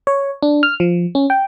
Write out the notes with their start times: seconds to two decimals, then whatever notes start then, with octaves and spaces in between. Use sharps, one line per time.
0.07 C#5
0.43 D4
0.63 F6
0.80 F3
1.15 C#4
1.30 G5